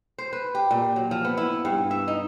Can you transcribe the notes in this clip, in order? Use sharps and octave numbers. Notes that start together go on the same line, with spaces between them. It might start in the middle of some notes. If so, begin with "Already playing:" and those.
C5
B4
G4
A#2
F#3
F3
B3
E4
G2
E5
D#4